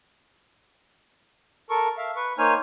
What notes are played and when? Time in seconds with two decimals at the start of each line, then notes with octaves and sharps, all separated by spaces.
1.70 A4 A#4 C#6
1.97 E5 F5
2.16 B4 C#6
2.38 A#3 D#4 C5 C#5 G#5 F6